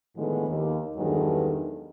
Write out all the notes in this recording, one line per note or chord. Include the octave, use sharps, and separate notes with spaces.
A2 D3 D#3 F3 G#3 B3
D#2
E2 G2 D#3 F#3 G#3 A4